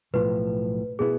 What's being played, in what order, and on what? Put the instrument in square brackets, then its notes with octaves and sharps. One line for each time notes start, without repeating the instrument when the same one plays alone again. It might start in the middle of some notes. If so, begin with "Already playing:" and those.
[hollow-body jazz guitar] B1 A2 F3 [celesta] B4
[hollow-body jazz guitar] B2 B3 E4 [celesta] G#4